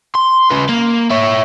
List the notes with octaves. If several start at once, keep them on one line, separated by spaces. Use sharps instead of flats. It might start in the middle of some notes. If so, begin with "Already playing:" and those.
C6
C#3 B4
A#3
E4 C#5